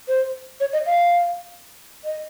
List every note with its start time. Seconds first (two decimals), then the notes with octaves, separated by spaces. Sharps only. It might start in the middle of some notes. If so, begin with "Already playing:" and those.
0.08 C5
0.60 C#5
0.73 D#5
0.86 F5
2.04 D#5